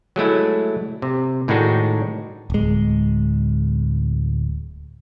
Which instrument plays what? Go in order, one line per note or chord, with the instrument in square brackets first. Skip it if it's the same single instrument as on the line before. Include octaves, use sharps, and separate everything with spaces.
[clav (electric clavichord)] F#3 G#3 A3 E4
C3
A2 D#3 G#3 D4 D#4 F#4
[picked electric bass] D1 G#3